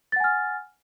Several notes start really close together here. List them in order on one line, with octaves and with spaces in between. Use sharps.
A6 F#5 G#5 F6